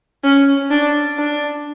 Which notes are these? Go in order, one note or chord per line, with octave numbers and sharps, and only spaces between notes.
C#4
D4
D4